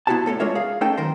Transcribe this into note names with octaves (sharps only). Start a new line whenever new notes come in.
B3 E4 F#4 G4 C5 A5
A2 A4 A#4 C#5
G#3 D4 F4 A#4 C#5 E5
G#4 F5
A3 C#4 D#4 A4 A#4 G5
F#2 D#3 A#4 C5